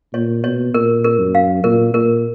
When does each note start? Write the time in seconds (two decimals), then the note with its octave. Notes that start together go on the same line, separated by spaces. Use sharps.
0.14 A#2 C#5
0.44 B2 C#5
0.74 A#2 A#4
1.04 A#4
1.19 F#2
1.35 F5
1.64 A#2 A#4
1.94 A#2 A#4